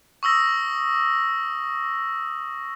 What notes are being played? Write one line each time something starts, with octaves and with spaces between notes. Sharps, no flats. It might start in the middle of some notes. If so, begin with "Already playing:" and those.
C#6 D#6 E6 A#6